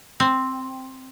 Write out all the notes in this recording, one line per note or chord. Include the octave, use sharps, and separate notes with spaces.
C4